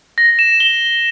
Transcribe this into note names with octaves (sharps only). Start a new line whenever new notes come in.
A#6
E7
G7